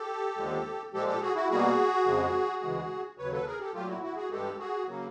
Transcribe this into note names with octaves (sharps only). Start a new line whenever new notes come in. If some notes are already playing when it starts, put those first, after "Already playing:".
Already playing: G4 A4
D#2 D3 F3 G#3
A#2 F3 G#3 G4 A4
G4 A4
F#4 G#4
E4 F#4
B2 G3 A#3 F#4 G#4
F2 C#3 F3 G#3
D2 C#3 E3 G#3
D#2 C#3 F#3 B4 C#5
A4 B4
G#4 A#4
G4 A4
A#2 F#3 A3 F4 G4
E4 F#4
E4 F#4
F#4 G#4
G2 E3 G#3 G4 A4
F#4 G#4
C#3 F#3 A#3